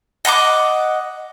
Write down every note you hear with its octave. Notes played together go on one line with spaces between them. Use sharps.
D#5 F#5 B5 D6